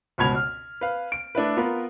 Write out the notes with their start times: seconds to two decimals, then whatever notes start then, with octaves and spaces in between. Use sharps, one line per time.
0.18 G1 C#2 B2 B5 G#6 F7
0.35 F6
0.81 B4 F5
1.12 D7
1.35 A3 D4 E4 B4
1.57 B3 F4 A#4 B4